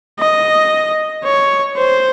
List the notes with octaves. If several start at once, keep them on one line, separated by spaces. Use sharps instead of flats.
D#5
C#5
C5